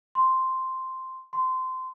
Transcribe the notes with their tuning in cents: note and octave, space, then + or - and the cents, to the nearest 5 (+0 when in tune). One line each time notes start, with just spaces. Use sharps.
C6 -5
C6 -20